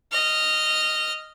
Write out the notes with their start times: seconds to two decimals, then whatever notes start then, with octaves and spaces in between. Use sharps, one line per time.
0.12 D#5 F6